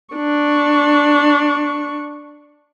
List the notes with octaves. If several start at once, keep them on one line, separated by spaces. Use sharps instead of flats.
D4 C#6